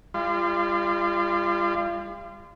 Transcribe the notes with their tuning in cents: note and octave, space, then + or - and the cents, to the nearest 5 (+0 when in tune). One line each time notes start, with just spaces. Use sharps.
G3 +30 F4 -30